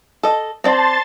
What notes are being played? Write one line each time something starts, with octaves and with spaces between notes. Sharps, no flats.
A4 D#5
C4 D5 G5 A5 C6 A6